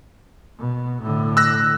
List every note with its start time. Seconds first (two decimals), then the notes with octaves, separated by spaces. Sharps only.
0.59 B2
1.02 A2 D3
1.37 E6 F#6 A#6